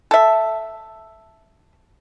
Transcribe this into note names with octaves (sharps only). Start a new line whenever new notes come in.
A4 E5